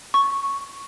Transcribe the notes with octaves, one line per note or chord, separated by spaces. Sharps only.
C#6